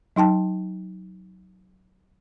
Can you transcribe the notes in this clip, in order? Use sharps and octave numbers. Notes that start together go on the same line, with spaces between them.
F#3 D#4 G5 A5